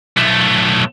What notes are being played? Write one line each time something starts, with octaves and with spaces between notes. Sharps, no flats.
B1 A3